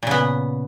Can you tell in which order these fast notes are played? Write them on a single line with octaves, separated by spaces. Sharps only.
A#2 C#3 B3